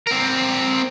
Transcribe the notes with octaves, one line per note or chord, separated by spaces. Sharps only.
C4 A#4